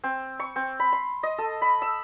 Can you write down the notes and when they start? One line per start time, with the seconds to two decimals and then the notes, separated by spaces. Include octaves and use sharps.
0.04 C4
0.40 C#6
0.56 C4
0.80 B5
0.92 C6
1.23 D#5
1.38 A4
1.62 B5
1.82 E6